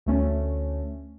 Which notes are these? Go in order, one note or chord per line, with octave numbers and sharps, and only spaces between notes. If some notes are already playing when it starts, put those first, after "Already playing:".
D2 A3 C#4